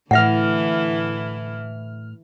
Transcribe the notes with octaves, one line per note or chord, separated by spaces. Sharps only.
A2 D3 E3 E4 E5 F#5 F6